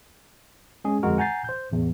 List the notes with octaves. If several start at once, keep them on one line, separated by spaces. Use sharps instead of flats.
G#3 C#4 G#4
G1 F2 G#3 F#4 A#4
F#5 G#5 A#5 G6 A6 C7
C5 G6
A1 E2